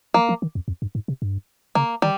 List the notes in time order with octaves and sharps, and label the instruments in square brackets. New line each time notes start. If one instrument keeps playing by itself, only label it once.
[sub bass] F3 [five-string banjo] A#3
[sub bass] F3
D#3
F2
F2
G2
G#2
C3
G2
[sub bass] C#3 [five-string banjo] A#3
[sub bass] D#3 [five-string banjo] G3